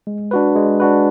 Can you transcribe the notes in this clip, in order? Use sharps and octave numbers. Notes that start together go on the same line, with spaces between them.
G#3
D4 F#4 B4
G#3
D4 F#4 B4